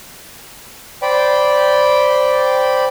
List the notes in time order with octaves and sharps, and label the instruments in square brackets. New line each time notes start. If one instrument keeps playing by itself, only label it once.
[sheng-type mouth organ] C5 D5 G5 B5